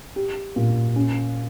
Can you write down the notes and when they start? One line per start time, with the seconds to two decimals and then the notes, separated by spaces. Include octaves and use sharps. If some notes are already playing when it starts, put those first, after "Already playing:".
0.16 G4
0.56 A#2
0.96 C#4